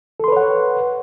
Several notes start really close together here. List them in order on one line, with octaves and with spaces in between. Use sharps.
A4 C6 B4 C#5 F#5